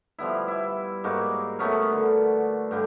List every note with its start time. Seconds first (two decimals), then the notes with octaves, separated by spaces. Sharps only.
0.19 F3 G3 B3 E4
0.48 E4
1.04 G#2 A#3 F#4 D6
1.59 A3 B3 C#4 A#4
1.92 D3
2.71 G2 D3 G3